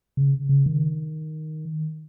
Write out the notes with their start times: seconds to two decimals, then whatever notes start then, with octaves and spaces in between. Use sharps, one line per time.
0.17 C#3
0.49 C#3
0.66 D#3